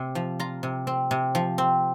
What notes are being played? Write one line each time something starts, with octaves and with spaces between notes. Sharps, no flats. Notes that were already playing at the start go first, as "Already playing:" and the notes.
Already playing: C3 C4
F3
F4 A#5
C3
C4
C3
F3
C4